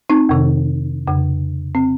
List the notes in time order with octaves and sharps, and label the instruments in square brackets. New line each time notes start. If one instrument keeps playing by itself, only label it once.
[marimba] C4 D#4
F2 C3 D#3
F2 C#3
C4